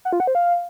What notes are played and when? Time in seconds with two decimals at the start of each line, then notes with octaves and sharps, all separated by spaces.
0.05 F#5
0.13 F4
0.20 F#5
0.27 C5
0.35 F5